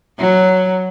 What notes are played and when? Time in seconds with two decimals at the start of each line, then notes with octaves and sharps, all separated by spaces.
0.19 F#3